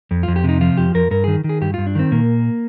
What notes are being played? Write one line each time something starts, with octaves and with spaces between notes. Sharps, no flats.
F2
F2 F4
G4
C3 D#4
F3 F4
F2 G4
F2 A#4
G2 A#4
D#3 G#4
D#3
G#4
G2 G4
G2 F4
D4
D#3 C4
A#2 A#3